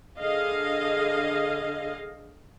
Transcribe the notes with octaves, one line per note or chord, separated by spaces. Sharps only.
D3 G#4 D#5 F5